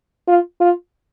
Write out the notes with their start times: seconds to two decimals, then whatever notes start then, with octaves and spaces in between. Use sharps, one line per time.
0.28 F4
0.60 F4